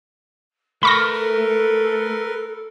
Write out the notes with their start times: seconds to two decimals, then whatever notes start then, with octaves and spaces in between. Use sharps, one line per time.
0.83 A3 A#4 B4 B5 C#6 F6 A#6
1.12 A4